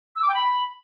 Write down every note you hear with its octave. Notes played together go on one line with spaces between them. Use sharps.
E6
D6
G5
B5